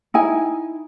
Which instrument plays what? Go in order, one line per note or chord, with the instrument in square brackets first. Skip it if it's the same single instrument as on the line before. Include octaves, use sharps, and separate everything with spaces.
[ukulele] D#4 E4 G#5